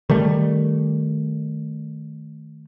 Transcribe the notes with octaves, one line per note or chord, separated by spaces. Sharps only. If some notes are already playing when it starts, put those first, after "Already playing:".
D#3 G3 A3